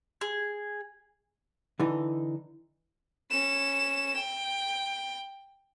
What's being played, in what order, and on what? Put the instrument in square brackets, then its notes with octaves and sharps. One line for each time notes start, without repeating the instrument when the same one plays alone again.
[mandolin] G#4
[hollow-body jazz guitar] D3 E3 D#4
[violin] C#4 E7
G5